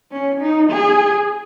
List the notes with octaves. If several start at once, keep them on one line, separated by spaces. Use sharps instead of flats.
C#4
D#4
G#4